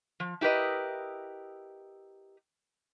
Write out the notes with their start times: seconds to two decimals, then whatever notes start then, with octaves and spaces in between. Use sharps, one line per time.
0.20 F3
0.41 E4 G4 A#4 B4 D#5